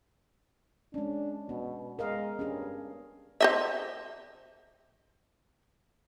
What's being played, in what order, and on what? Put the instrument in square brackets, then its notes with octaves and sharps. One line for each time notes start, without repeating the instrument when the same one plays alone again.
[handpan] G#3 C#4 [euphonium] D4
[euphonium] B2 [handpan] B3
[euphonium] G#3 [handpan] A#4 D#5 F5
[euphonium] G2 [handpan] C#4 D4 G#4
[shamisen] C5 D#5 E5